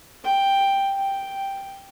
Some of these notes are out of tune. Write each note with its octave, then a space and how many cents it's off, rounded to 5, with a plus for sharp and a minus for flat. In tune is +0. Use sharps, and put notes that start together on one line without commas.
G5 +5
G5 +0